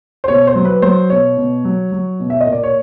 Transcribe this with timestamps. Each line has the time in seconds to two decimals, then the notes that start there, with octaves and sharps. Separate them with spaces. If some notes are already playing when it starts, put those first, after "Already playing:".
0.24 C5
0.28 B2 C#5
0.47 C5
0.55 F#3
0.65 B4
0.82 F#3 C5
1.10 B2 C#5
1.37 B2
1.65 F#3
1.92 F#3
2.20 B2
2.30 E5
2.41 D#5
2.47 A#2
2.53 D5
2.63 C#5